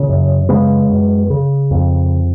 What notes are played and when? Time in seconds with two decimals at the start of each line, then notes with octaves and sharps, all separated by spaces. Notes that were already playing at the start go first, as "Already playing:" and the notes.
Already playing: A#2 C#3
0.09 F#2
0.49 C#3 G#3 B3
0.90 F#2
1.30 C#3
1.71 F2